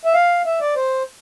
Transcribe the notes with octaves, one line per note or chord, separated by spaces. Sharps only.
E5
F5
E5
D5
C5